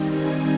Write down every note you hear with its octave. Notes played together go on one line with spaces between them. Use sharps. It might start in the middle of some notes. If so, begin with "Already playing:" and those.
Already playing: D#3 G3 C4 D#4
G#5